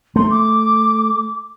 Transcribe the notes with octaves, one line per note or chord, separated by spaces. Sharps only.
A3 C6
D6